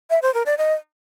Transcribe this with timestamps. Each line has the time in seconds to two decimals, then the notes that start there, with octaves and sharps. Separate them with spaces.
0.10 E5
0.22 C5
0.34 A#4
0.46 D5
0.58 D#5